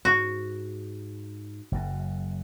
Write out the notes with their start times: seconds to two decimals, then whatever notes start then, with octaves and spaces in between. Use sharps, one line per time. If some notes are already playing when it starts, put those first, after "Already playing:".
0.05 G#2 F#4
1.72 F#1 F#2